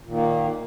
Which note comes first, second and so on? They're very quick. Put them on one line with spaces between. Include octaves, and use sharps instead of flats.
A#2 D#3 A#3